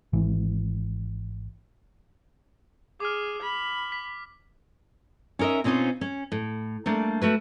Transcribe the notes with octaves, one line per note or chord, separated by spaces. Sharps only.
G#1 E3
G#4 D6 F6
B5
B6
C#4 D#4 A#4 D#5 E5
B2 C4 C#4 D#4 F4 C5
C#4
A2
G3 A3 A#3 D4
A3 F#4 B4